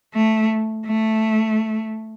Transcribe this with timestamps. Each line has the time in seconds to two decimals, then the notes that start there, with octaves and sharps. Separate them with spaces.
0.14 A3
0.85 A3